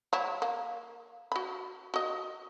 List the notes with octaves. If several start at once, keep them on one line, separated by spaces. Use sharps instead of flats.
F#3 E4
A#3
F#4 B5
F#4 D#5